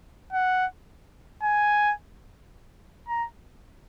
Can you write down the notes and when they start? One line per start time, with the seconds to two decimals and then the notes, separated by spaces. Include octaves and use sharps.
0.33 F#5
1.43 G#5
3.09 A#5